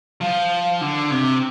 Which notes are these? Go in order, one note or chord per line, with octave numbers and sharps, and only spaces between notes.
F3
D3
C3